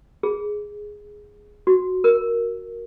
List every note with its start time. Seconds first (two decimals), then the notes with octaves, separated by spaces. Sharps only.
0.23 G#4
1.67 F#4
2.04 A#4